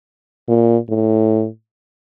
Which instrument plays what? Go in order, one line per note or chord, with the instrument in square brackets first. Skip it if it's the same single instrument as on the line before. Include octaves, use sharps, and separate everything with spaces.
[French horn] A#2
A2